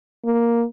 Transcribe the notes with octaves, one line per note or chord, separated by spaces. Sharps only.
A#3